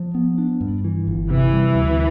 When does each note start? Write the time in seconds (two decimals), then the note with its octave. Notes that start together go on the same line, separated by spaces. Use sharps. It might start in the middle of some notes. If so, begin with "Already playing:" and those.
Already playing: F3
0.15 B3
0.38 D4
0.61 G2
0.84 E3
1.07 G1
1.30 C3 E3
1.53 G3
1.75 D2